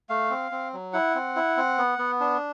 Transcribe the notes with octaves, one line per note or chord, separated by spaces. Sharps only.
A3 F5
C4
C4
F#3
E4 F#5
C4
E4
C4
B3
B3
D4